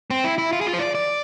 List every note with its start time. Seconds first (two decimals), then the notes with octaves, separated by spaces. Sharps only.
0.10 C4
0.24 E4
0.38 E4
0.53 F4
0.61 G#4
0.66 F4
0.73 C5
0.80 D5
0.95 D5